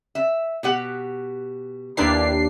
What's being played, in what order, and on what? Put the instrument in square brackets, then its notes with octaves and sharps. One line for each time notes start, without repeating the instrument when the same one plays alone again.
[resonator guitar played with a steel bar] E5
B2 G4 F#5
[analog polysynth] D#2 D4 C7 [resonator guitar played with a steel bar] E4 G4 B4